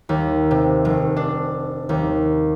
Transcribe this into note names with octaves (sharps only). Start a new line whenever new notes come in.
D#2
C3
F1
D4
D#2